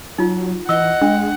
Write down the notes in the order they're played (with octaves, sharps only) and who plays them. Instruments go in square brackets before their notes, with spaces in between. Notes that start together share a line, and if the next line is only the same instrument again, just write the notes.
[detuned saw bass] F#3 [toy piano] D#4 F4
[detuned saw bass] E3 [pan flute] D#5 [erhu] F#5 [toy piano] E6
[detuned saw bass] G#3 [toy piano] D4